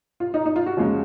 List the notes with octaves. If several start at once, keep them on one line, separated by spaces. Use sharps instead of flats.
F4
D#4
D#4
F4
F#4
F2 C#3 G#3